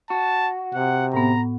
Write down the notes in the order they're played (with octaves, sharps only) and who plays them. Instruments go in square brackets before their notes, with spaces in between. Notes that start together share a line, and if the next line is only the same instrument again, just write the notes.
[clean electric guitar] F#4 [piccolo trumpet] A5
[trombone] C3 [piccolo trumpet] F#5
[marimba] A2 B3 [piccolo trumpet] A#5